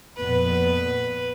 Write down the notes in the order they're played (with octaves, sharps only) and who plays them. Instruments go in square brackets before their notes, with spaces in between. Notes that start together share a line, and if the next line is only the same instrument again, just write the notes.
[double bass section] F2 A#2 B3 [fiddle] B4